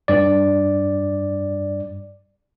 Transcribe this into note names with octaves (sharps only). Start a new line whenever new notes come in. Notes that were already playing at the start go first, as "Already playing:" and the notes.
G2 D5